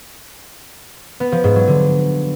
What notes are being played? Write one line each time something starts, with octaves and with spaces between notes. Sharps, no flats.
B3
F3
G#2
F#3
D3